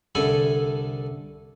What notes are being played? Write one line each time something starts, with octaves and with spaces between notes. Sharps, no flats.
C2 D3 A4 E5 G#5 B5